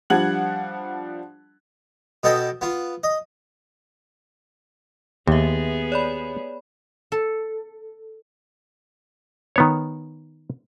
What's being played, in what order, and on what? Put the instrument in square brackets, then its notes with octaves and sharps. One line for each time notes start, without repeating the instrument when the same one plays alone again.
[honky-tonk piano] F3 G3 D4 F#5 G#6 F#7
[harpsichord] B2 B3 A4 D#5 G5 A5
B3 F4
D#5
[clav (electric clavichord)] D#2 [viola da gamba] B3 G#4 [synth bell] G4 E5
[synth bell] C#5 D5 B5
[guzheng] A4
[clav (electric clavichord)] D#3 B3 C#5